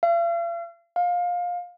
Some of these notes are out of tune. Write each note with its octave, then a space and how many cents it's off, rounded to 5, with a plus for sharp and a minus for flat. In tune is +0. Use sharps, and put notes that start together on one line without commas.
F5 -45
F5 +20